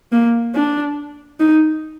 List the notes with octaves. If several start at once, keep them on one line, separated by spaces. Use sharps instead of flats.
A#3
D4
D#4